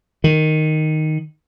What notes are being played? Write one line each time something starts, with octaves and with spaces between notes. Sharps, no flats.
D#3